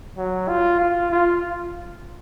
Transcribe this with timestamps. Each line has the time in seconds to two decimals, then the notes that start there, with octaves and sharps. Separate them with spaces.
0.17 F#3
0.48 F4
0.79 F4
1.12 F4